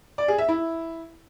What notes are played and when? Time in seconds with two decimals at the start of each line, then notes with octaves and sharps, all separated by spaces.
0.18 D5
0.28 G#4
0.38 E5
0.49 E4